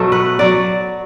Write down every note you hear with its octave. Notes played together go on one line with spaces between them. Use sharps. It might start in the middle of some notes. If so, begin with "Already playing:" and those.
Already playing: B2 F#3 A3 A4
B4
F#3 D5